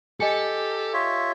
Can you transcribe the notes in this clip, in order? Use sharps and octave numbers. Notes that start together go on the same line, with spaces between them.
G4 A4 D#5 G#5 C#7
F4 C#5 E5